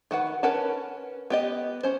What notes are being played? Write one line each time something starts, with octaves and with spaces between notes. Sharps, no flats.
D#3 F#4 B4 F#5
C#4 A#4 B4 F#5 A5
B3 G4 D#5
C#4 C5